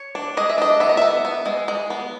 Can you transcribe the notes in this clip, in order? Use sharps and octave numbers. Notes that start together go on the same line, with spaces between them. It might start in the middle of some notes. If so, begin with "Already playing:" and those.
Already playing: C#5
D4
G#3 D#5
E5
D4 D#5
B3 E5
D#5
B3 E5
B3
G#3
G#3
B3